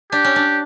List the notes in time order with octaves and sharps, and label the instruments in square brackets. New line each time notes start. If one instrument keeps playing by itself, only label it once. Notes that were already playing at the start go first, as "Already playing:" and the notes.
[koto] D4 [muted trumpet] G4
[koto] C#4
D4